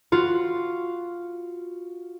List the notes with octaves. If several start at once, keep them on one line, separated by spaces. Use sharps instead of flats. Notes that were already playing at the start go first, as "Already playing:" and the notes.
F4 F#4